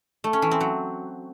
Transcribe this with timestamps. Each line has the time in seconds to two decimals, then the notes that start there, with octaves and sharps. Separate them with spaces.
0.24 A3
0.33 C#4
0.42 E3
0.51 C4
0.61 F#3